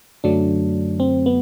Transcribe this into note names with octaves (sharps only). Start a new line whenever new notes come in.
F#2 D3 F#3 A3 D4
C4
B3